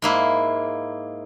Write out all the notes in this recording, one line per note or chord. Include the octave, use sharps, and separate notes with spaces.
G#2 A#3 E4